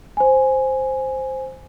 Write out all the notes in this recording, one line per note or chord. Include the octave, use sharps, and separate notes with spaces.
C5 G#5